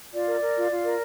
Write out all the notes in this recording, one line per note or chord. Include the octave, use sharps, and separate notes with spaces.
F4 D5
A#4
A#4
F4
F4
A#4